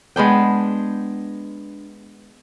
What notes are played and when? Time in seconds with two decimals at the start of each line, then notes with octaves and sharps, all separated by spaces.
0.16 G#3 B3 D4 G5